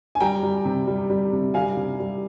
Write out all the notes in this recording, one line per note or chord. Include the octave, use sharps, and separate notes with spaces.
G#5
G3 G5 A#5
G3
C3
G3
G3
C3
G3 F5 G#5
C3
G3